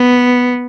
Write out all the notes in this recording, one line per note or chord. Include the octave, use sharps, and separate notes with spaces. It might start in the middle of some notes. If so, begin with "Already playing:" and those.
Already playing: B3